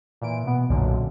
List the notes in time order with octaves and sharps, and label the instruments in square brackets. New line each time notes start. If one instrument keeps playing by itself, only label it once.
[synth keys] A#2 E3 D7
B2 B3
B1 F#2 A#2 D3